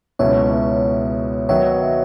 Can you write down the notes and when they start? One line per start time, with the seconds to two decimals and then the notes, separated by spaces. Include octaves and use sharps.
0.19 C#2 B2 F#3 C#4 E4 C#5 E5
1.49 D#3 F#3 B3 D#4 F#4 C#5 E5